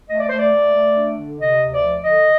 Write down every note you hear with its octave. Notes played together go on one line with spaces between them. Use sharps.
A3 D#5
D5
A3 C5
D5
A3
A3
D4
D3
C3 D#5
D2
D5
F3
D3 D#5